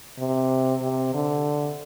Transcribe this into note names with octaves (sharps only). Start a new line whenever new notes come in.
C3
C3
D3